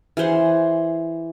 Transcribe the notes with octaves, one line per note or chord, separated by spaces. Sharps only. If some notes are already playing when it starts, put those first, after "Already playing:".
E3 G#4 C5 F#5